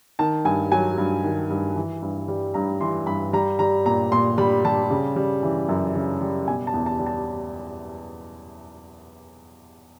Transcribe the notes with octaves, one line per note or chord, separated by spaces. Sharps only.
D#3 A5
G2 G#5
F#3 G#5
G2
D#3
G2
E3
G2
G3
G2 A#5
E3 C6
G2 B5
G3 A#5
G3 A#5
A#2 A#5
A#2 C6
G3 B5
G3 A5
C#3
G3
E3
F#2
C#3
G3
B2 G#5
A5
E2
A5
G3
A5